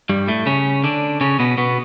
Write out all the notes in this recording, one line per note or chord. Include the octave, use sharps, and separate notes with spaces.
G2 G3
A2 A3
C#3 C#4
D3 D4
C#3 C#4
B2 B3
B2 B3